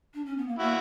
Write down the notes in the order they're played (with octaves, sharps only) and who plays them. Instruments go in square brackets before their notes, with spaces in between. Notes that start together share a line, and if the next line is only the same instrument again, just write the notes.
[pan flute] D4
C#4
B3
A#3
[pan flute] A#3 [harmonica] E4 F#4